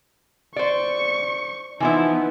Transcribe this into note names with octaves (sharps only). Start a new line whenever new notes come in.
C5 D5 C#6
E3 F3 B3 D#4 E4